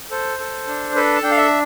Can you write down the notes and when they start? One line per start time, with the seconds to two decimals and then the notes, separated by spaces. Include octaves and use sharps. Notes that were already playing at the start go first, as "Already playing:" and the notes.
0.11 A4 C5
0.39 A4
0.67 D4
0.96 A4 B4
1.16 A5
1.23 D4 G5
1.31 F5
1.37 E5